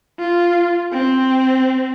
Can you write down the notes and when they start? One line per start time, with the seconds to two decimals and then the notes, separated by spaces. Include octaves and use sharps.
0.19 F4
0.92 C4